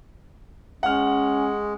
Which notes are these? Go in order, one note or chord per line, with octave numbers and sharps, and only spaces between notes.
G#3 C#4 F#5 F6